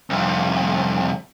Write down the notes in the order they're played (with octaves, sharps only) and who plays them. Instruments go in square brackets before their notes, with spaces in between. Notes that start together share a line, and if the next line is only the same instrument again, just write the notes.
[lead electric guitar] C2 F2